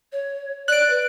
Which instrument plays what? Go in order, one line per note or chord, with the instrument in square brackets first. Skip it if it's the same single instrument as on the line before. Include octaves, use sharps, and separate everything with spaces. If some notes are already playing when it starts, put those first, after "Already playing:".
[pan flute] C#5
[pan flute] D5 [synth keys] F#6 D7
[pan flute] B4